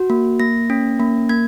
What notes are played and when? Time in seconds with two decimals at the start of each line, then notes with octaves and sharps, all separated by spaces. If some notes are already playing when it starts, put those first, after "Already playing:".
Already playing: F#4
0.10 A#3
0.40 A#3 A#6
0.70 C#4
1.00 A#3
1.29 A#3 G#6